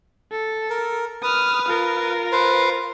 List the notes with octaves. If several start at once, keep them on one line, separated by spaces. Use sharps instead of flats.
A4
A#4
B4 D#6 F6
F4 A#4
B4 C5